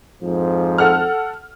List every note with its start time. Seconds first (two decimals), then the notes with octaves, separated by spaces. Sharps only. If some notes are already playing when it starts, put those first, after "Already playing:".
0.22 F2 G#2 F3
0.78 A4 F#5 F6